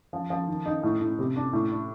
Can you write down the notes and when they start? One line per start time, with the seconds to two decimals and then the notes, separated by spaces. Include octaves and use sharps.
0.13 F3
0.30 F3
0.48 D#3
0.66 D#4
0.83 A2
1.01 A2
1.18 C3
1.36 D4
1.53 A2
1.71 D4